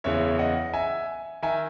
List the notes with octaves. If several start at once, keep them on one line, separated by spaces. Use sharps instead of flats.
F#1 E2 C#3 E3 C#5 E5
D#5 F#5
E5 G#5
D#3 E5 G#5